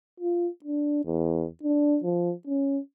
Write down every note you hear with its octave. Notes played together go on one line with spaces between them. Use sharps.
F4
D4
E2
D4
F3
C#4